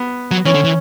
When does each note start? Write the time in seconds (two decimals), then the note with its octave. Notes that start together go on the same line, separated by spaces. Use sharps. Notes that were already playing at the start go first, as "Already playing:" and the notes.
Already playing: B3
0.31 F#3
0.45 E3 C#4
0.54 D3
0.64 E3